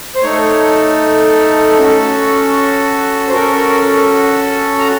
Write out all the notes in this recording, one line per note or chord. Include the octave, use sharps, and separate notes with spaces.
C5
A3 D#4 A4 C#5
C#4 F#4 A4
C5
C#4 F#4 A4 A#4
A#5